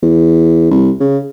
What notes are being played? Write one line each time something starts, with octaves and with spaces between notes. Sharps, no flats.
E2
C2
C#3